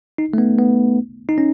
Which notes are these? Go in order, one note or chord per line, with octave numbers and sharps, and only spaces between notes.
D#4
A3
B3
B3
D#4
C#4